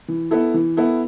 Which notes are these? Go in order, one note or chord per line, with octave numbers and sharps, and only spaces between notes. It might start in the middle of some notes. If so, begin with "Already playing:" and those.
E3
B3 E4 A4
E3
B3 E4 A4